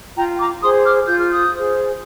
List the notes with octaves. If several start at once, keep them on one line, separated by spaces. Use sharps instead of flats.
F4 G5 A#5
A#5 D6
G#4 C5 C6 D#6
D6 F6
F4 G6
F6
D#6 G6
G#4 C5